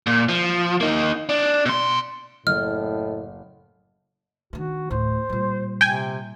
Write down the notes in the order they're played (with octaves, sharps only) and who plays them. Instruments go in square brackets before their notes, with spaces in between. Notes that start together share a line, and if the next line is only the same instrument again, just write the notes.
[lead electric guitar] A#2
F3
A#3 D#4
D4
B2 C6
[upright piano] F#1 [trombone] A2 [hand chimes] D#5 [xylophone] F6
[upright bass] D#3 D4 [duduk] F#4
[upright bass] D2 A2 [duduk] C5
[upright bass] A#2 G3
[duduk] C3 [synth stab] G5 G#5